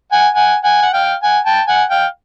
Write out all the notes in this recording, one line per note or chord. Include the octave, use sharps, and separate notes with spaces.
F#5 G#5
F#5 G#5
F#5 G#5
F#5
F5 G5
F#5 G#5
G5 A5
F#5 G#5
F5 G5